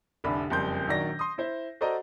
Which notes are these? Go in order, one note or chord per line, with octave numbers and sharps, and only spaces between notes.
F1 C2 D3 D4 B5
F#1 F2 G3 C6 G6
A#1 D#3 F#3 D5 A#6
C6 D#6
E4 C5 E5
F#4 A4 C5 D5 D#5 A#5